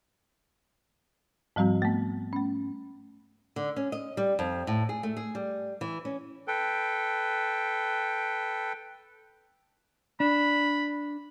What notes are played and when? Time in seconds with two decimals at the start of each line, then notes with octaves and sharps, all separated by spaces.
1.56 G#2 F3 G3 C4 F#4
1.82 A3 B3
2.33 A3 C#4
3.56 D3
3.76 C#4
3.92 D#5
4.17 G3
4.39 F2
4.67 A2
4.89 G#4
5.03 A3
5.17 G#4
5.35 G3
5.81 E3
6.05 C#4
6.48 A4 B4 G5
10.20 D4 B5